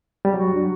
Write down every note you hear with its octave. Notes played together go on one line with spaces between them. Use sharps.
G3
F#3 F#4
D4